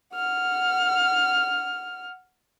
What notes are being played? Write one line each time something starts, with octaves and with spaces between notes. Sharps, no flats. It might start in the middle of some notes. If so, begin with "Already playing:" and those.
F#5 F6